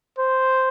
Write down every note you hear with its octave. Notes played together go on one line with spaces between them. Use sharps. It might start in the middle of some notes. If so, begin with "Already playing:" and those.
C5